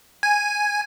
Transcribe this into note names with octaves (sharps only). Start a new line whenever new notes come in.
G#5